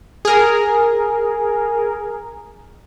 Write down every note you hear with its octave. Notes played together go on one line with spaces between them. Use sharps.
G#4 A#4